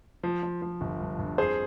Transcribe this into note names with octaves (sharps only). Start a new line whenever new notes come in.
F3
F3
F3
G1
G2
G2
F2 G#4 C5